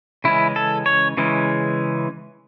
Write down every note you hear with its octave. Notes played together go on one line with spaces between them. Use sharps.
C#3 E3 G#3 C#4 E4
A4
C#5
C#3 E3 G#3 C#4